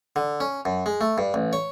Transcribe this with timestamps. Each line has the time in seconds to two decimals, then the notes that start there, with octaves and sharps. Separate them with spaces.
0.16 D3
0.40 C#4
0.65 F#2
0.86 G#3
1.01 A3
1.18 G2
1.34 A1
1.53 C#5